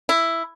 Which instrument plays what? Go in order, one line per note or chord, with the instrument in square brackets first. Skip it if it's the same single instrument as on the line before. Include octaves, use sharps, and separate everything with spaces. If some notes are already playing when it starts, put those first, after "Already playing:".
[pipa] E4